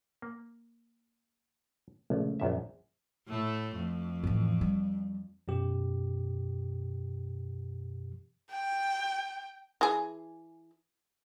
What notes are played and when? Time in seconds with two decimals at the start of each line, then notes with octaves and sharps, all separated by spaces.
0.22 A#3
2.10 A#1 C#3 G#3 A3
2.40 A#1 F#2 E5
3.28 A2 A3
3.76 F2
4.24 A2 E3
4.61 G3
5.48 F#2 B2 G4
8.51 G5
9.81 E3 G#4